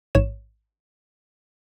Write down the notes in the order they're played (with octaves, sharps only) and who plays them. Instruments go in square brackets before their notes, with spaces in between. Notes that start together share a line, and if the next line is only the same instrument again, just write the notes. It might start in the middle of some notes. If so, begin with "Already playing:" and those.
[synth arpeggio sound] A1 G#2 C#5 E7